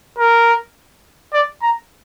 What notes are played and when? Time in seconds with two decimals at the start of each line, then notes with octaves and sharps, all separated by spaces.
0.19 A#4
1.33 D5
1.62 A#5